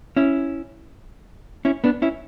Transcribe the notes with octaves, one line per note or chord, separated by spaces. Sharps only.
C#4 E4
C#4 E4
B3 D4
C#4 E4